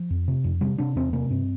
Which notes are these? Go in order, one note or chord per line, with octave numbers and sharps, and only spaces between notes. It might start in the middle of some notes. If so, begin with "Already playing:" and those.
Already playing: F3
F2
C3
F2
C3 G3
C3 D4
E2 C4
C3 A#3
G2 C4